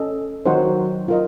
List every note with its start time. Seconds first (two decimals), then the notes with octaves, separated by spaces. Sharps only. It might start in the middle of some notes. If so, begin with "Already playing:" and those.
Already playing: C#4 A4 D#5
0.46 D#3 F#3 C5 D#5 F#5
1.08 F4 A#4 D#5